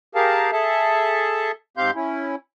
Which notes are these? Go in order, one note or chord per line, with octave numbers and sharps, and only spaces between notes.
G4 G#4 A#4 F5 A5
G#4 A4 E5 A5
G#2 C4 G4 F5 C6 G6
C#4 E4